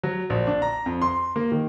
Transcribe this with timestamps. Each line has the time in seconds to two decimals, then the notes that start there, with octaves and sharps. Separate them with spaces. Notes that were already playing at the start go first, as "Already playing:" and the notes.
0.03 F#3
0.30 A#1
0.47 D4
0.62 A#5
0.86 F2
1.02 C6
1.36 A#3
1.52 D#3